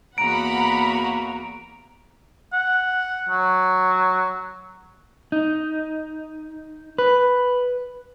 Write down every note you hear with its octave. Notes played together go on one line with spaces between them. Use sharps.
E2 A#3 F#4 F#5 A#5 B5 D7
F#5
F#3
D#4
B4